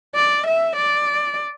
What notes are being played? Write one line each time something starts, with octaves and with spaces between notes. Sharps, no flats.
D5
E5
D5